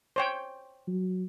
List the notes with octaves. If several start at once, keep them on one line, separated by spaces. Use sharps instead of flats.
C5 C#5 G5
F#3